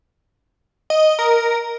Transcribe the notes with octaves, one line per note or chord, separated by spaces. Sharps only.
D#5
A#4